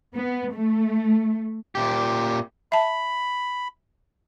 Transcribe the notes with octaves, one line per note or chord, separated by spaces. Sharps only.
B3
A3
A#2 G4
E5 A5 B5